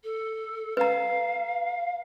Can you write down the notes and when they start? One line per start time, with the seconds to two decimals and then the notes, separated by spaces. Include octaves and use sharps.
0.03 A4
0.77 B4 F5 A#5